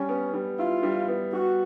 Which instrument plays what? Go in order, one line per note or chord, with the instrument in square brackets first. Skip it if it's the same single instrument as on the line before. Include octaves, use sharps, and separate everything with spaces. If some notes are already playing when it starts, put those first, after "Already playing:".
Already playing: [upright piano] G3 [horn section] C#4
[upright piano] B3
G3
[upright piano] E4 [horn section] F4
[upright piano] G3
B3
[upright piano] G3 [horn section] F#4